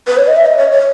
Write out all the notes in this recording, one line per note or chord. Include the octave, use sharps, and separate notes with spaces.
B4
C#5
D#5
E5
D#5
C#5
C#5